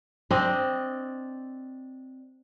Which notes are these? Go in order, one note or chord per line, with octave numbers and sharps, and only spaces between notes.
C4 D4 D#5